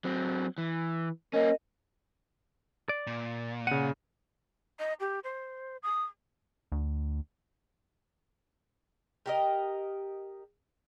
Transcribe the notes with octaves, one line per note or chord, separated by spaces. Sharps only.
F#3 C4
E3
A#3 C#4 A#4 D#5
D5
A#2
C#3 F#5 D#7
D#5
G4
C5
D#6
D2
G4 A#4 D#5